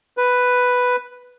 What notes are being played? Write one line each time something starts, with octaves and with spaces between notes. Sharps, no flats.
B4